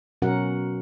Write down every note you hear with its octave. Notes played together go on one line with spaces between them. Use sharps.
B2 F#3 C#4 F#4 A#4 F#5